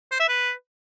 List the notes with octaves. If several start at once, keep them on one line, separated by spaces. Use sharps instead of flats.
C5
E5
B4